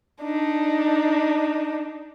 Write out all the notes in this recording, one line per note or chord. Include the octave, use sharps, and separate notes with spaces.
D4 D#4